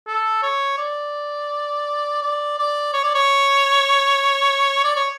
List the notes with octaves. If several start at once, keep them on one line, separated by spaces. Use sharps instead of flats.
A4
C#5
D5
D5
D5
C#5
D5
C#5
D5
C#5